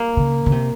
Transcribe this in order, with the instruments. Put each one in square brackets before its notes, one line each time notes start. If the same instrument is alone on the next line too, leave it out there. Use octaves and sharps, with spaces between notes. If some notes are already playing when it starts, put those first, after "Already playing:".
Already playing: [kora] A#3
[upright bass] C#3
C#3
C3